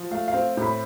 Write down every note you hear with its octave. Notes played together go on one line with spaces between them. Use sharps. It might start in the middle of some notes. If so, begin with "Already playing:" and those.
Already playing: F3
A3 F5
F5
C4
A2
B5